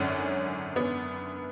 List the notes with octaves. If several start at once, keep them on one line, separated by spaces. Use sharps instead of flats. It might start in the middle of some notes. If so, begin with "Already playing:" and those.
Already playing: G#1 F#2 D3 C#4
B3